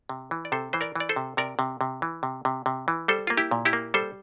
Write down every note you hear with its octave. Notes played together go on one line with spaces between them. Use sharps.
C3
E3
D5
C3 A4 C5
E3 C5
A#4 D5
E3 D5
A4 C5
C3
C3 A#4 D5
C3
C3
E3
C3
C3
C3
E3
G3 A4 C5
A#3 F4
E4 G4
A#2
E4 G4
A#3
G3 A4 C5